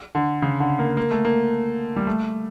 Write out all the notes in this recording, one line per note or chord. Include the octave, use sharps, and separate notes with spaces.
D3
C#3
D3
A#3
A#3
A3
A#3
G3
A3